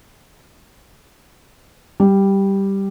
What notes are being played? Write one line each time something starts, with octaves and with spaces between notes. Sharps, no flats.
G3